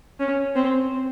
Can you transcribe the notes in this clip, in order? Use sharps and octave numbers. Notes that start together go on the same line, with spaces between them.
C#4
C4